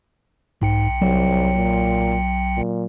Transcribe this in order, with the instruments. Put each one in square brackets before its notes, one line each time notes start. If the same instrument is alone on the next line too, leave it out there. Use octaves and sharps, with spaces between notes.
[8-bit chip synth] B1 G5 C#7 [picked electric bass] G#2
[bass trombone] C2 [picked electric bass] F#3
[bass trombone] A#2
A#2